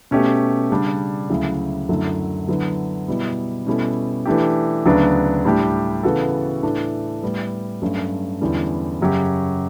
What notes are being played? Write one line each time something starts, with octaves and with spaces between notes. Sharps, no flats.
B2 A3 C#4 G4
C#3 G3 D4
D2 C#3 F#3 C#4 E4
F#2 D3 F#3 A3 E4
D3 F#3 B3 E4
B2 G3 B3 E4
B2 G3 C#4 E4 A4
E3 A3 D4 G4
D2 C#3 F#3 B3 D4
A2 G3 D4 G4
C#3 E3 B3 F#4 A4
A2 E3 A3 D4
A2 G3 B3
G2 F#3 A3 C#4
E2 D3 G3 C#4 E4
F#2 C#3 F#3 C#4 G4